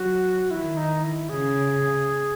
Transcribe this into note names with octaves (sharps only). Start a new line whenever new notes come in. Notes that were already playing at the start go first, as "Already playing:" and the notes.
Already playing: F#3 F#4
D#3 E4
D#4
E4
C#3 G#4